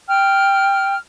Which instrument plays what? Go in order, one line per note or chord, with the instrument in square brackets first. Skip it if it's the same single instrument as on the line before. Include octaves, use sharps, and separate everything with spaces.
[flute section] G5 F6